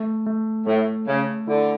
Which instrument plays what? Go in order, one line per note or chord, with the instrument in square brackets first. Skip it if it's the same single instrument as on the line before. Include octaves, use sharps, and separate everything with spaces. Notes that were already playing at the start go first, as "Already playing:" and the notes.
Already playing: [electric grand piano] A3
A3
[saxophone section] A2 [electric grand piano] A3
[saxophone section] C#3 [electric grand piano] A3
[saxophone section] D3 [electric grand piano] E4